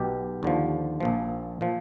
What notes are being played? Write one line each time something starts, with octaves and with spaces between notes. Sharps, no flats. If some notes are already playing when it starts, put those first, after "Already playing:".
Already playing: B1 B2 G4
D#2 D3 F3
A#1 A#2 F3
A#2 F3